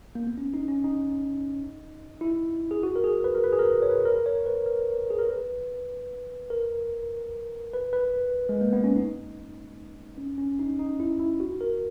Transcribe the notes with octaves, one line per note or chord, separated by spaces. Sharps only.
A#3
B3
C#4
D#4
C#4
D#4
E4
G#4
F#4
A#4
G#4
B4
A#4
B4
G#4
A#4
C#5
B4
B4
A#4
C#5
B4
A#4
G#4
A#4
B4
A#4
B4
B4
G#3
A#3
B3
C#4
D#4
C#4
C#4
D#4
D#4
E4
E4
F#4
A#4